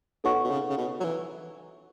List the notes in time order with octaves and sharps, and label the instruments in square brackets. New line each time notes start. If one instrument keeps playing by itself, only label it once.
[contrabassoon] B2 [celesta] D#4 A4 C#5 F#5 C#6
[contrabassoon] B2
C#3
C#3
B2
F#3
E3